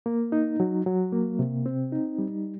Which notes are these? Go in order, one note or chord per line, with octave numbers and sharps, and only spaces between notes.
A#3
D#4
F#3
F#3
A#3
C3
C4
D#4
G3